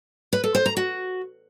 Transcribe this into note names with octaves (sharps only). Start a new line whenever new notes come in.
B4
A4
C5
A#5
F#4